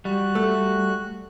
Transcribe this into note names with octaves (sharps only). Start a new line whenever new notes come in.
G3 F#4 F#6
A3